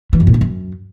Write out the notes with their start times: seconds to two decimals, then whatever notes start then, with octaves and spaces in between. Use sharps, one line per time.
0.13 E3
0.20 F#2
0.27 A#2
0.34 G2
0.41 F#2